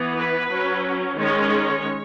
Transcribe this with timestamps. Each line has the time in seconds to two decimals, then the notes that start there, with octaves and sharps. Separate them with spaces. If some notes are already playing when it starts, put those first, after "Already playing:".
Already playing: E3 B3
0.16 B4
0.50 F#3 C#4
1.17 D#3 G#3 C#4 C#5